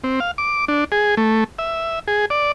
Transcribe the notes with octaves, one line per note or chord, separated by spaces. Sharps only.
C4
F5
D6
D4
G#4
A3
E5
G#4
D5